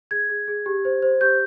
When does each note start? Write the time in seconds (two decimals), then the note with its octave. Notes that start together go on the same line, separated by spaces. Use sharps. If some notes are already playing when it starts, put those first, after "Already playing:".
0.11 G#4 G#6
0.30 G#4
0.48 G#4
0.66 G4
0.85 C5
1.02 C5
1.21 G4 G6